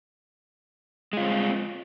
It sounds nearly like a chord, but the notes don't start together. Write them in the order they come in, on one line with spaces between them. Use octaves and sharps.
G#3 F4 C4